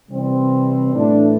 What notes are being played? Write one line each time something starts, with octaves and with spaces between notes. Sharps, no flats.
C3 E3 G3 C4
A2 E3 A3 D4